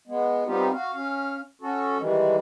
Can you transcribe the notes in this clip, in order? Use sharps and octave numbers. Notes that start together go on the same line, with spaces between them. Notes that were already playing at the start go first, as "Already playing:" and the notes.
G#3 B3
G3 B3 C4 D#4 F4 G4
F#4 F5
C#4 F5
C#4 F#4 A4
D#3 E3 G3 G#3